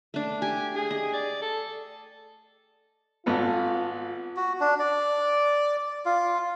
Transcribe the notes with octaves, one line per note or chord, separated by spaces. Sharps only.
A3 D4
G4 G#5
G#4
D#5
D5
A4
G#1 B3 F4 A4
F#4
D4
D5
F4